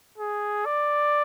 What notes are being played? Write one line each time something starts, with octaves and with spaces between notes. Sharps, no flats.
G#4
D5